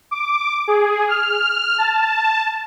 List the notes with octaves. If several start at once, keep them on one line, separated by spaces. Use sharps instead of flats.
D6
G#4
F6
A5